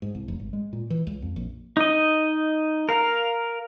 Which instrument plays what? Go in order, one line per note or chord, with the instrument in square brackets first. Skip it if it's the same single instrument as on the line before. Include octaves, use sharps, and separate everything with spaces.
[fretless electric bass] G#2
C2
F1
G#1
G#3
A#2
E3
C#2
F2
A#1
[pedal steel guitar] D#4 D#5
A#4 F5